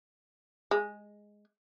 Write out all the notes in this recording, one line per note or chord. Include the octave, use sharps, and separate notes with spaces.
G#3